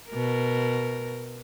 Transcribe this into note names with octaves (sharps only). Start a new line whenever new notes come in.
B2 A#4